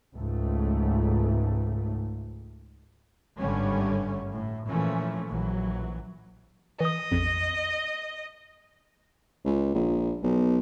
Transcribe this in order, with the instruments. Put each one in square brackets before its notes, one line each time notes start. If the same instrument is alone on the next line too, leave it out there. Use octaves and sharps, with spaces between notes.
[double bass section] C#2 G#2 A3
G#1 G2 D3 G3 A3 C#4
A2
A#2 E3 F3 A3 C#4
A#1 E3 F#3
[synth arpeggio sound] E3 D#6 [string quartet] D#5
[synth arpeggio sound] A#1 F2
[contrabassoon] C#2
A#1
B1